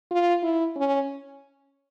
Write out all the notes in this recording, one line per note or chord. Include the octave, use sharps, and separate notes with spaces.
F4
E4
C#4